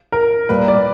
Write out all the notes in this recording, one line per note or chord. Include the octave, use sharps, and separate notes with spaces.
A#4
A#2 G3 A#3 B4
D5